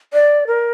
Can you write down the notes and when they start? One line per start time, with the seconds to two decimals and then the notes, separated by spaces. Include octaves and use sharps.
0.13 D5
0.47 A#4